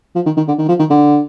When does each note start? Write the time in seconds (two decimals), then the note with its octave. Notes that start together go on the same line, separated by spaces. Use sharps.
0.15 F3
0.26 D#3
0.37 D#3
0.48 D3
0.58 D#3
0.68 F3
0.79 D#3
0.90 D3